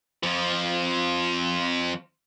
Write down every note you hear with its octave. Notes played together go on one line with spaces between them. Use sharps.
F2 F3